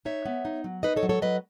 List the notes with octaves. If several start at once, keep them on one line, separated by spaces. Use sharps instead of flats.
D#4 C#5 E5
B3
D#4
F#3
D#4 B4 D#5
A4 C#5
F#3
A4 C#5
F#3 B4 D#5